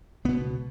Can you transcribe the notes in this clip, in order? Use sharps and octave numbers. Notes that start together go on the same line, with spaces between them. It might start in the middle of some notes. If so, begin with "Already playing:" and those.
C#2 B2 B3